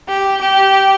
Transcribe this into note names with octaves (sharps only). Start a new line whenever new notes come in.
G4
G4